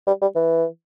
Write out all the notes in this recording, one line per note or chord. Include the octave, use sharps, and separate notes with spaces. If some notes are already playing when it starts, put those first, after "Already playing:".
G3
G3
E3